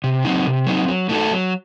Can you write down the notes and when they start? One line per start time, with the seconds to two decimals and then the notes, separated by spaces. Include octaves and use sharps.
0.04 C3
0.25 F#3 C4 D#4
0.46 C3
0.67 F#3 C4 D#4
0.88 F#3
1.09 A3 D#4 F#4 A4
1.31 F#3